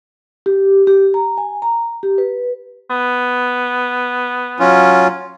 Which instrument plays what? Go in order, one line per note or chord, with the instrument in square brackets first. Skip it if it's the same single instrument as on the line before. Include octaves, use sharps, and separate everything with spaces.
[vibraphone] G4
G4
A#5
G#5
A#5
G4
B4
[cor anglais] B3
[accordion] F#3 C#4 F4